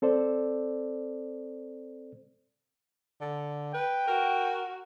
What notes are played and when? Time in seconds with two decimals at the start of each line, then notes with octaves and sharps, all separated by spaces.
0.02 C4 A4 C5 D5
3.21 D3
3.74 B4 G5
4.07 F#4 A#4